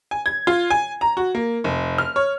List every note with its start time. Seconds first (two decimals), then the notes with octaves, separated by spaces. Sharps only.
0.11 G#5
0.26 G#6
0.47 F4
0.70 G#5
1.01 A#5
1.17 F#4
1.35 A#3
1.64 F1
1.98 F6
2.16 C#5